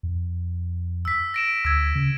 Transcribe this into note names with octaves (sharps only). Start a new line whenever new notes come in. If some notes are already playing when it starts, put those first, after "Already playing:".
F2
E6 B6
A#6 D7 E7
D2 E6 G#6
C#3